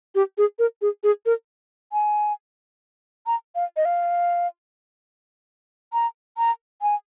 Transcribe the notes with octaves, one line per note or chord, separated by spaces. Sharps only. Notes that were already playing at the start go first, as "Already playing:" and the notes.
G4
G#4
A#4
G#4
G#4
A#4
G#5
A#5
F5
D#5
F5
A#5
A#5
G#5